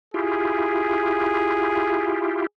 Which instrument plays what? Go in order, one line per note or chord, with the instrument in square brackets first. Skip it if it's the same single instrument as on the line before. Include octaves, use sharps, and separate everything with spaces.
[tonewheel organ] E4 F4 G4 [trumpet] G#4